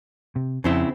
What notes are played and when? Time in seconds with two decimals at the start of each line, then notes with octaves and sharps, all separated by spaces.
0.36 C3
0.64 F2 C#3 C4 E4